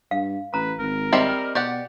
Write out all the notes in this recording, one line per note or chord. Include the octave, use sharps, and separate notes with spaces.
G2 F5
A1 B4 A#5
G#1 A#4
G3 C4 D#5 E5
B2 G4 D5 F#5